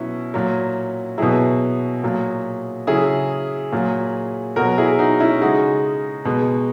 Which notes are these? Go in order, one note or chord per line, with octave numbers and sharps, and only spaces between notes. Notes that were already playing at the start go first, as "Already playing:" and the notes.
Already playing: B2 F#3 C#4 E4
A#2 F#3
B2 F#3 E4 G#4
A#2 F#3
C#3 F#3 E4 G#4
A#2 F#3
B2 F#4 A#4
F#3
E4 G#4
D#4 F#4
C#4 E4
C#3 G#3 D#4 F#4
B2 G#3